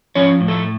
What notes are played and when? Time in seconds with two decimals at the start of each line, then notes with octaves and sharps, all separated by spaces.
0.15 F3 C#4 C#5
0.40 A2
0.48 A3 A4